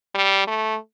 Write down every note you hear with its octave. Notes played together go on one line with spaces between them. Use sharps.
G3
A3